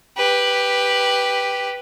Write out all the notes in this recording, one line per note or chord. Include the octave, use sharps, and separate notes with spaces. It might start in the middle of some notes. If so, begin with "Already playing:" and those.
G4 B4